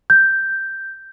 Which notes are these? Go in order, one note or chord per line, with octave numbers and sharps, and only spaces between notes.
G6